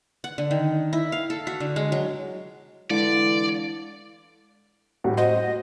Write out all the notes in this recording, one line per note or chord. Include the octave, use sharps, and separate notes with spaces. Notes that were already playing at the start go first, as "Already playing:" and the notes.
F#5
D3
D#3
E4
F5
A4
F#4
D3
G#3
F#3
D3 E3 G#3 D5 F5 C#7
A2 G3 F#4
F#4 C5 D#5